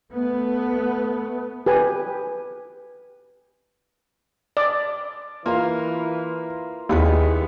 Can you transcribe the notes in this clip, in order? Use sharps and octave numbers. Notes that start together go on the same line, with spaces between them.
A3 B3
G4 B4 G#5
D5
E3 A#3 F4 A#4 F5
D#2 D#3 G3 G#3 B3 E4 B4